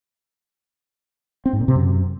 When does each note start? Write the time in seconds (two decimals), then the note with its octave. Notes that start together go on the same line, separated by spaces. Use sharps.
1.46 C4
1.53 G#2
1.61 A#2
1.68 C3
1.76 F#2